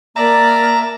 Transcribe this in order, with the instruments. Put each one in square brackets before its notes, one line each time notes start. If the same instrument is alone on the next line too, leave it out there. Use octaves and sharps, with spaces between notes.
[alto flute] A#3 [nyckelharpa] D5 [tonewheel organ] E5 A5 [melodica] A#5